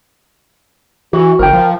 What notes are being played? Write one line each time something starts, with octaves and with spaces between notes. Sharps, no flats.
E3 F#4
G1 A#4 G5
F3